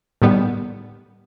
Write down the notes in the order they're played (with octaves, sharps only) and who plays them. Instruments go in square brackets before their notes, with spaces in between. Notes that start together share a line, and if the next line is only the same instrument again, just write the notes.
[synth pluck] A2 D#3 G3 B3